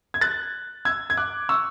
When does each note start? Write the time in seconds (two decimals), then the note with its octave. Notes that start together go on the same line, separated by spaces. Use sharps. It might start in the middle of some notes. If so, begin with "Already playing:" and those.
0.14 G#6
0.21 F#6 A6
0.85 E6 G#6
1.10 G#6
1.17 D6 F#6
1.49 C#6 E6